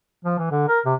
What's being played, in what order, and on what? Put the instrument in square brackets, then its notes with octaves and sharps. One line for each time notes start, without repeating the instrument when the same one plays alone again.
[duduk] F3
E3
D3
A#4
C3